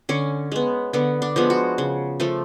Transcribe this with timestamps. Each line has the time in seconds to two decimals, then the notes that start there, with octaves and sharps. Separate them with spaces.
0.09 D3 C#4
0.52 G#3 B3
0.93 D3 B3
1.22 D4
1.36 F3 G#3 B3
1.50 F#4
1.78 C#3
2.20 F3 A3